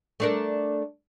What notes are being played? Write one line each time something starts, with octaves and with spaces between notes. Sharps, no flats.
A3 D4 A#4